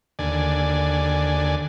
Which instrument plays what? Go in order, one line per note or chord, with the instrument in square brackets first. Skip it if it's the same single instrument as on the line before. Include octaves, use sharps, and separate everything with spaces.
[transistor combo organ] D#2 D3 D5 G#5